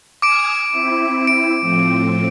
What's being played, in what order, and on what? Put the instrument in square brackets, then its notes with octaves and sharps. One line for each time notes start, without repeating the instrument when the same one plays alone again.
[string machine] G#5 D#6 F6 [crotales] D6 D7
[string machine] C4 E4
[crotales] D7
[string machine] A2 F3 C4